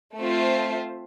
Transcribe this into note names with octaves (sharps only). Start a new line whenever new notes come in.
A3 C4 F4 C5 E5